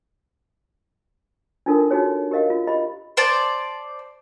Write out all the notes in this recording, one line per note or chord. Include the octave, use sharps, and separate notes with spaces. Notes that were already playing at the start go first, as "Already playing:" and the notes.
D4 D#4 F4 A4 A#4
D#4 F4 F#4 G#4 C#5
G4 A#4 D#5 F5
F4
G4 D#5 B5
C5 D5 A5